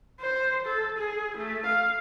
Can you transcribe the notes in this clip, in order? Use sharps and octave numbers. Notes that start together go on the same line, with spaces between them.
C5
A4
G#4
A3
F5